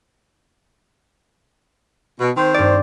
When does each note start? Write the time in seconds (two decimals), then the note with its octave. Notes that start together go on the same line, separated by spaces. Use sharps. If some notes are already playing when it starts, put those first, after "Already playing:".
2.20 B2
2.36 D#3 C4 C5
2.54 G2 D5